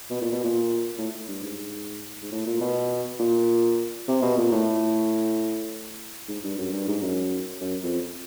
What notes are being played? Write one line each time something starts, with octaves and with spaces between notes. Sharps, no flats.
B2
A#2
B2
A#2
A2
G2
G#2
G#2
A2
A#2
B2
A#2
C3
B2
A#2
A2
G#2
G2
F#2
G2
G#2
F#2
F#2
F2